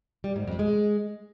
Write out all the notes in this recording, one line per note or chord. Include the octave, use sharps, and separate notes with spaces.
G3
G#2
F2
G#3